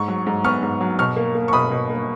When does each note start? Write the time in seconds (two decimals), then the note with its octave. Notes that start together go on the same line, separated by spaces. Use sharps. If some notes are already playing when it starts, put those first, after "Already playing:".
Already playing: G#2 C#6
0.08 F#3
0.27 G#2
0.44 B3 C#6 F6
0.63 G#2
0.81 F#3
0.99 B2 C#6 F6
1.16 A#3
1.35 A#3
1.48 C#6
1.53 B2 B5 D#6
1.71 B2
1.90 A#3